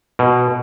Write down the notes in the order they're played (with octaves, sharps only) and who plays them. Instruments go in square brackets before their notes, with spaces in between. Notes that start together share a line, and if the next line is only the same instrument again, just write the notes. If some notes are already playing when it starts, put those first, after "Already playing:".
[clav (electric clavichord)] B2